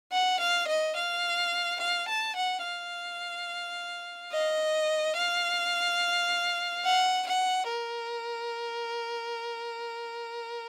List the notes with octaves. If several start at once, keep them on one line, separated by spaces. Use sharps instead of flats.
F#5
F5
D#5
F5
F5
A5
F#5
F5
D#5
F5
F#5
F#5
A#4